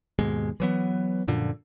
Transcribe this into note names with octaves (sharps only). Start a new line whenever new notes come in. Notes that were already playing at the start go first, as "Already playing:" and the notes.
D#2 G#2 B2 G#3
E3 F#3 B3
F#2 A#2 D3 F3